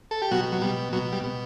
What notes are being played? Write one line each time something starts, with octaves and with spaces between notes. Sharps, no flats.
A4
G4
B2 F#3 F#4
F#3
B2 G3
B2 F#3
G3
B2